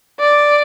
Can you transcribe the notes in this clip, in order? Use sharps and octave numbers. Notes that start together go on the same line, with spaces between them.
D5